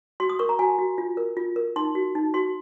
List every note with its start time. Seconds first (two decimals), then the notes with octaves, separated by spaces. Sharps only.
0.20 F#4 C6
0.29 D#6
0.39 A#4 C#6
0.49 A#5
0.59 F#4 G#5
0.78 F#4
0.98 F4
1.17 A#4
1.37 F4
1.56 A#4
1.76 D#4 C6
1.95 F#4
2.15 D#4
2.34 F#4 C6